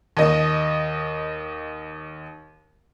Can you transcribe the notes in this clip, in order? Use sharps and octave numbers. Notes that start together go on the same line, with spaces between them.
D#2 D#5